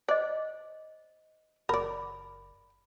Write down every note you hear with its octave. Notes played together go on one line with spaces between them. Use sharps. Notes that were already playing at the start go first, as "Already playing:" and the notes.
C5 D5 D#5
F#1 A#4 D5 B5